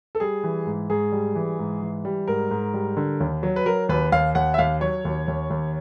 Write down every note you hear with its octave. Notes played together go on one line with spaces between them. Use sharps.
A4
G3 G#4
E3
G#2
G#2 G#4
G3
E3
G#2
E3
G3
G#2 A#4
G#2
G3
D3
D#2
F#3
B4
F#3 A#4
D#2 B4
D#2 F5
D#2 F#5
E5
D#2 F5
F#3 C#5
D#2
D#2
D#2